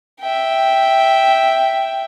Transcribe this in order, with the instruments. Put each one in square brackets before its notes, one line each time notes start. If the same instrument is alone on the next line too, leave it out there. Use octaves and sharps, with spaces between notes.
[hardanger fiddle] E5 G5